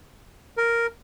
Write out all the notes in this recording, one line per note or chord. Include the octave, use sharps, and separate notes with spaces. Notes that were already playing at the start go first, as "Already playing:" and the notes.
A#4